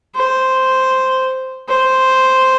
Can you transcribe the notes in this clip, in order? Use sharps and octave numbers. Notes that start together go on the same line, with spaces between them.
C5
C5